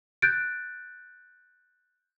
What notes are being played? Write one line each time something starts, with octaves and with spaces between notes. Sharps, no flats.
F#6 G6 A6 D7